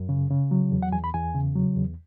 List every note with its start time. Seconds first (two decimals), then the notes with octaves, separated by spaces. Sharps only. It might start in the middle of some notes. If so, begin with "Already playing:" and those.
Already playing: F#2
0.09 C#3
0.30 C#3
0.51 F#3
0.72 E2
0.82 F#5
0.92 E2 G#5
1.04 B5
1.14 E2 G#5
1.34 C#3
1.55 F#3
1.76 E2